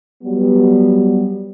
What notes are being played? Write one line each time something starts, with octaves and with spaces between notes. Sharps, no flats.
F#3 G3 B3